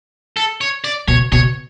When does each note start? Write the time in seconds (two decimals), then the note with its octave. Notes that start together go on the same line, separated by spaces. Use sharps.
0.37 A4
0.61 C#5
0.84 D5
1.08 B2 C#5
1.32 B2 C#5